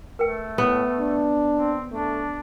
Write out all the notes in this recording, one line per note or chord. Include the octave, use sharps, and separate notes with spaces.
A3 A#4 B4 G5
A2 B3
D4
C4
A3 D4